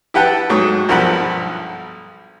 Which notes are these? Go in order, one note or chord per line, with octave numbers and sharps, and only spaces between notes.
E4 G4 B4 F#5 G5 A5
G#2 F#3 A3
B1 G2 F3 A#4 F#5 B5